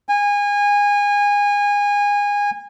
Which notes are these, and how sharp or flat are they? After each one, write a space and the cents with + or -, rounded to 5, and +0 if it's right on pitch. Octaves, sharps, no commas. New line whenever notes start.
G#5 -25